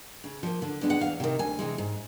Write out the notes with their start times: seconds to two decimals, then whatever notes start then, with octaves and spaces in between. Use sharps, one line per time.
0.24 C#3
0.43 F3 A#3
0.62 D3
0.81 F3 G#3 B3 D4
0.90 F#5
1.01 E2 F5
1.20 C3 D#3
1.39 D2 G#5
1.59 C3 E3 G#3
1.78 G#2